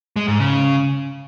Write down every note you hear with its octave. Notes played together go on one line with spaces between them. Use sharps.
G#3
G#2
C#3